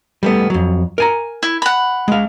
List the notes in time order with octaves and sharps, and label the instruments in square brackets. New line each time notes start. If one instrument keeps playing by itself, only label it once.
[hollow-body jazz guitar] G3 A3 B3
F2 F#3
A#4 G#5 A#5
[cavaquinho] E4
F#5 B5
[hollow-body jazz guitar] G#3 F5